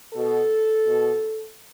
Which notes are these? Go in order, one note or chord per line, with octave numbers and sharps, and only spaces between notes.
B2 A4
B2